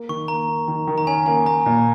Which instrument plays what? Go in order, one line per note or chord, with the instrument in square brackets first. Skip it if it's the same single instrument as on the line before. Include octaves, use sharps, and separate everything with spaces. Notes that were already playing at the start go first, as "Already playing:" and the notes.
Already playing: [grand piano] A#3
[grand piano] D#3 [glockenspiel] C#6
[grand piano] A#3 [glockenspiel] A#5
[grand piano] A#3
D#3
D#3
[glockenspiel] A#5
[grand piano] C#4 [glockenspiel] G#5
[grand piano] A#3 [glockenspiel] G#5
[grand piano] A#3 [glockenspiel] A#5
[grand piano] A#2